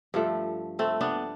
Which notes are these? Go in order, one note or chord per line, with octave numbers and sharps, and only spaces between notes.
G2 F3 A3
A3 C4
B3 D4